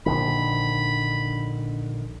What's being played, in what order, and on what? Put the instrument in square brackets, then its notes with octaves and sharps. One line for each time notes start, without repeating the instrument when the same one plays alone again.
[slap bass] A#1 D3 D#3 [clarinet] B5